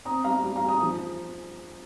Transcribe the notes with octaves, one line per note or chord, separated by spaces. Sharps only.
C4 A#5 D#6
G3 F5 A#5
G3
F5 A#5
G3
A#5 D#6
F3